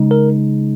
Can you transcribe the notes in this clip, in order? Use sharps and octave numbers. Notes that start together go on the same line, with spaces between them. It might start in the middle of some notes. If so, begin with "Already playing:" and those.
Already playing: C#3 G#3 D#4
A#4